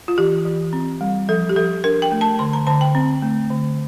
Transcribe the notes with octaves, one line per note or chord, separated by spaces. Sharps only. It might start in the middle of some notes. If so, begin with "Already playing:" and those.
F4
E3 G4
E3
C4
G3
F3 A4
G4
F3 A4
D4 A#4
G5
A3
A5
D3 C6
A#5
D3 A5
G5
C4
A3
D3